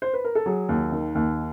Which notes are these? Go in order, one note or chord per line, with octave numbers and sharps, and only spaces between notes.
C5
B4
A#4
A4
F#3 G#4
D#2
D#3
D#2